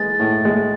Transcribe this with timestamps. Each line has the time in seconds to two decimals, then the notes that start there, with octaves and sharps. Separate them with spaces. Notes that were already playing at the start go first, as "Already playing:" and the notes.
Already playing: E3 G#3 A6
0.20 A2
0.45 G#3